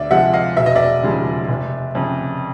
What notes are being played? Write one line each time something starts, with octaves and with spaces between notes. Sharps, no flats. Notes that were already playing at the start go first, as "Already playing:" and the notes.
Already playing: D2 D5 E5
C3 F3 G#3 E5 F#5
D#5 F5
E1 E5
D#5
D5 E5
D#2 C#3 F3 G#3
F1
F2 C#3